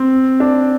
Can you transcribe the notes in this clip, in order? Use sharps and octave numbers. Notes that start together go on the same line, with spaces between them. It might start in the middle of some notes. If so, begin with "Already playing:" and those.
Already playing: C4
D4